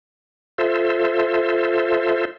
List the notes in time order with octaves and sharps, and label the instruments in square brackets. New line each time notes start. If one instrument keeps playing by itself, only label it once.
[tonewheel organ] F4 A4 C5 E5